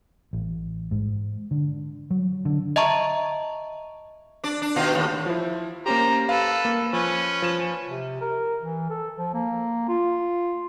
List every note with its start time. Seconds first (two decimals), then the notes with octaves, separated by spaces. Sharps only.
0.33 A1
0.91 G#2
1.51 D3
2.11 F#3
2.45 D3
2.76 D#5 E5 A5 A#5 C#6
4.44 D4 D5
4.62 D4
4.76 B2 D#3 F4
4.95 D#2 A2
5.26 F3 E4
5.86 A#3 C#4 G4 C5 A#5
6.29 A4 B4 F5
6.65 A#3
6.93 F3 C#4 B4
7.42 F3 E7
7.87 C3
8.21 A#4
8.61 E3
8.90 A4
9.17 F3
9.34 A#3
9.89 F4